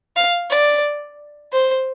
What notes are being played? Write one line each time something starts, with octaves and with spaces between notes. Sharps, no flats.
F5
D5
C5